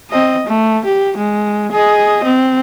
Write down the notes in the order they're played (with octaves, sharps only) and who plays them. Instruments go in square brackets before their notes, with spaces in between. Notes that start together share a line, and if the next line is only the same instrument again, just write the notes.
[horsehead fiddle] C4 D#5
A3
G4
G#3
G#4 D#5
C4